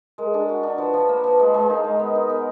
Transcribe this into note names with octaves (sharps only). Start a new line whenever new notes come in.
G#3 A#4
G#4
D4 A#4
F#4
D4
F3 B4
F3
A#3
F3
G#3
G#3
D#4 A#4
G#3 A#4
B3
D#4
B3 A#4